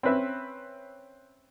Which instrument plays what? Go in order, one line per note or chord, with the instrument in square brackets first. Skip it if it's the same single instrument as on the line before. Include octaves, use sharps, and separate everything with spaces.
[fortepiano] C4 C#4 B4 E5